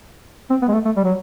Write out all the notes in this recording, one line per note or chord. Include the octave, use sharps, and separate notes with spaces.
C4
B3
G#3
A3
A3
G3
F#3